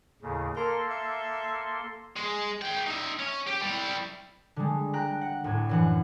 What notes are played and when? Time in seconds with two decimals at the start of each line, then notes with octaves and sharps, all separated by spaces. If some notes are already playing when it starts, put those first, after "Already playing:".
0.22 D#2 A2 C#3
0.56 A#3 A4 A#4 C6
0.91 E5
2.16 G#3
2.62 G#4 G5
2.87 D#4 E5
3.19 C#4
3.47 G4
3.62 G3 E4
4.56 D3 G3 G#3
4.93 G5 A#5 F#6
5.21 F#5
5.44 D2 A2 G#6
5.69 F#2 E3 F#5